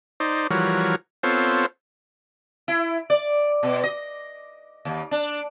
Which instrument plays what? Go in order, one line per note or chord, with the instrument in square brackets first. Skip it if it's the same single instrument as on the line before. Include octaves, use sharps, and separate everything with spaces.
[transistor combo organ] D#4 C5 D5
E3 F3 G3 F#4 A#4 C#5
B3 C4 F4 A4 C5 C#5
[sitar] E4
D5
B2
D#5
D#2
D4